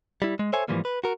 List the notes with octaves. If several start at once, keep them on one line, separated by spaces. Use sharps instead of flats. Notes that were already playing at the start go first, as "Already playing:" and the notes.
G3 E4
G#3
A4 C5 C#5 E5 G#5
G#2 C#3 E3 F3 G3 A#3
B4
F#4 A#4